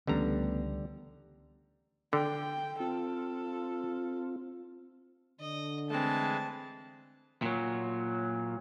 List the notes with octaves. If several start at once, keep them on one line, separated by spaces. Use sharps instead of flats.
C#2 D3 E3 G3 A3 B3 C#4 A#5
D3 G5
C4 F4 A4
D3 D#5
E3 G#3 A3 C4 A5
A#2 F#3